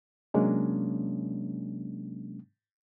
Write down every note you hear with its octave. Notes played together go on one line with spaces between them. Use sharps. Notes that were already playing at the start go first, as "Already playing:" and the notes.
C3 F#3 G#3 A#3 C#4 D4